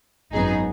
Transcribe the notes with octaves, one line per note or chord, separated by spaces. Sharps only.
G#1 F#2 F#3 B3 D#4 G#4